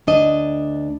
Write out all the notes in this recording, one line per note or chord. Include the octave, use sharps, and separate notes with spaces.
D2 D4 D#5